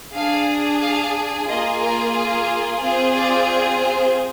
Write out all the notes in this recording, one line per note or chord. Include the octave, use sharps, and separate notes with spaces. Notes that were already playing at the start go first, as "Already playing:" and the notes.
D4 G#4 F5
F5
A#3 F4 G#4 D#5
A#4
C4 F4 G#4
D5
C5